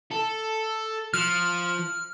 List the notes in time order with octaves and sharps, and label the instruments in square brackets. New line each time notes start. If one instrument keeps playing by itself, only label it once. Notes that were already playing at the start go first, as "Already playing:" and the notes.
[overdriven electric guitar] A4
[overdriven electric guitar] F3 [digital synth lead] F6